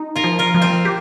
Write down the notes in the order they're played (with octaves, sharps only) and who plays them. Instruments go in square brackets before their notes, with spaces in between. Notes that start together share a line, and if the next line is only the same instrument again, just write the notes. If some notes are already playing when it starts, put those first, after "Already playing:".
Already playing: [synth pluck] D#4
[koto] F4 A#4
[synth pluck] F3
[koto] F4 A#4
[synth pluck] F3
[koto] C4 F4
[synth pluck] G4